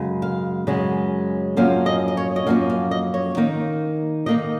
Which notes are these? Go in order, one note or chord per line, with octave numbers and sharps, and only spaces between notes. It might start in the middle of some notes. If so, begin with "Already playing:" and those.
Already playing: F#2 C#3 G#3
F5
F#2 C#3 G#3
F#2 F3 A#3 C#4 F5
D#5
D#5
C#5
D#5
F#2 F3 A#3 C#4 F5
F5
D#5
C#5
D#3 A#3 D#4
D#3 A#3 D#4 D#5